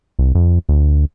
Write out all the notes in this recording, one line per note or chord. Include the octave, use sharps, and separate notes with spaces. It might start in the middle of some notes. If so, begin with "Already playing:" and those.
C2
F2
D2